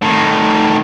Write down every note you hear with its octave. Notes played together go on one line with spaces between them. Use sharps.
A2 D#3